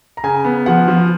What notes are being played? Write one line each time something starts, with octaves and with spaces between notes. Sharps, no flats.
A#5
C#3 G#5
B3
F3 F#5
F3